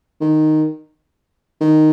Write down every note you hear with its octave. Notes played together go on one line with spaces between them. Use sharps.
D#3
D#3